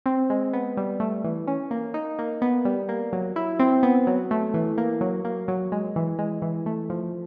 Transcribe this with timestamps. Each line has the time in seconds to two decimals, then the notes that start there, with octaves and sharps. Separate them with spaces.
0.06 C4
0.30 G#3
0.53 B3
0.77 G3
1.00 A3
1.24 E3
1.47 C#4
1.71 A#3
1.94 D#4
2.19 A#3
2.42 B3
2.65 G3
2.89 A#3
3.13 F#3
3.36 E4
3.59 C4
3.83 B3
4.07 F#3
4.31 A3
4.54 E3
4.78 A#3
5.01 F#3
5.25 A#3
5.48 F#3
5.72 G#3
5.96 E3
6.19 G#3
6.42 E3
6.66 A3
6.90 F3